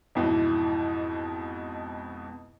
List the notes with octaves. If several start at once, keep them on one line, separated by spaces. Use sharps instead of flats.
F2 G#2 B2 E3